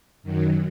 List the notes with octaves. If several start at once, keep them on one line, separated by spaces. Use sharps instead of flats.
F#2 D#3 F#3